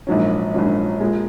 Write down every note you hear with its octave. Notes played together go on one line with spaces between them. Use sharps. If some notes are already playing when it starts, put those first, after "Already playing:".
A#1 G#2 F#3 C#4
A#1 G#2 F#3 C#4
A#2 G#3